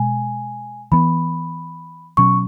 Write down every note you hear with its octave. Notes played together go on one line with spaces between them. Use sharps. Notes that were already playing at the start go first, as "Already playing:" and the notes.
Already playing: B2 G#3 G#5
E3 B3 B5
B2 F#3 C#4 C#6